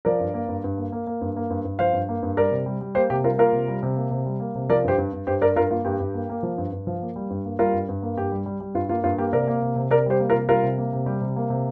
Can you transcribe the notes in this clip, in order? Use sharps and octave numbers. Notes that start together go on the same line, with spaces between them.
F3 A#4 D5
G2
A#3
G2
G2
A#3
A#3
A#3
G2
A#3
G2
G2
F3 C5 F5
G2
A#3
G2
G3 A#4 D5
C3
G3
G3
A#3 G4 C5
C3 G4
G3 F4 A#4
A#3 F4 A#4
C3
G3
C3
A#3
C3
G3
A#3
C3
F3 A#4 D5
G2 G4 C5
G2
G2
G2 G4 C5
G2 A#4 D5
G2 F4 A#4
A#3 F4
G2 G4
G2
A#3
A#3
F3
G2
G2
F3
A#3
G3
G2
A#3
G3 F4 A#4
G2
G2
A#3
G2 G4
G3
G3
G3
G2 F4
A#3 F4
G2 F4
A#3 G4
C3 A#4 D5
A#3
C3
C3
C3 A#4 D5
G3 G4 C5
A#3
F4 A#4
C3
G3 F4 A#4
C3
A#3
C3
G3 G4
C3
A#3
C3